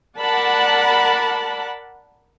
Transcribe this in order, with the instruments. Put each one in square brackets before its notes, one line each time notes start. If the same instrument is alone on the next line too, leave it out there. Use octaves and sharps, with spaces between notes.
[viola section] A#4 D5 F#5 A5 B5